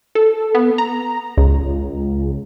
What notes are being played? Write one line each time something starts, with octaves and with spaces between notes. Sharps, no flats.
A4
B3
A#5
C#2